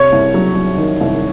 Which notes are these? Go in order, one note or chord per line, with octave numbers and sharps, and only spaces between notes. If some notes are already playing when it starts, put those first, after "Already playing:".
Already playing: C3 C#5
C2
F#3
F#3
D#3
C2